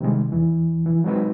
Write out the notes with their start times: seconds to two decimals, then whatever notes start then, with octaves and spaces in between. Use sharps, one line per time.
0.01 C3 D#3 G3 G#3
0.32 E2 E3
0.86 E3
1.04 F#3 G#3 C4 D#4 F#4 B4